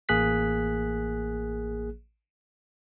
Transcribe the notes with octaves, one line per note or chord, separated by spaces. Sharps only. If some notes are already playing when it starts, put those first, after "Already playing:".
A1 A#3 G#4 F#6 B6